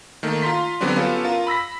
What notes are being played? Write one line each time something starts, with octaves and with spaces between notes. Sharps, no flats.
D#3 A3 A#3
F4 A#5 C6 B6
D3 F#3 G3 B3 C4 D4
B3 C#4 F4 G4 A4
F4 A#4
B5 E6 A#6 B6